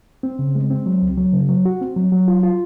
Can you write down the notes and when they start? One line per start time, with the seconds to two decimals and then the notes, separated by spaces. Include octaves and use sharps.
0.23 C4
0.39 C#3
0.55 G#3
0.70 C4
0.86 F#3
1.02 C#2
1.18 F#3
1.33 C#3
1.49 F#3
1.65 F#4
1.81 C4
1.96 F#3
2.12 F#3
2.28 F4
2.43 F4